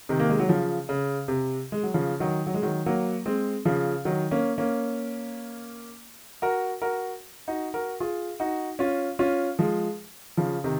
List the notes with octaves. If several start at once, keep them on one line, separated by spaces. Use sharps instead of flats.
C3 D#3
A#3
G#3
F#3
C#3 F3
C#3
C3
G#3
F#3
C#3 F3
D#3 F#3
F#3
G#3
D#3 F#3
F#3 A#3
G#3 C4
C#3 F3
D#3 F#3
A#3 C#4
A#3 C#4
F#4 A#4
F#4 A#4
D#4 F#4
F#4 A#4
F4 G#4
D#4 F#4
C#4 F4
C#4 F4
F3 G#3
C#3 F3
C3 D#3